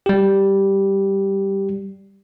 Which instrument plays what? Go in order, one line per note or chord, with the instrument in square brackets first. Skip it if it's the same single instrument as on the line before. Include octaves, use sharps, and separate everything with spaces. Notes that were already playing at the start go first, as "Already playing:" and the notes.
[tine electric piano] G3 G4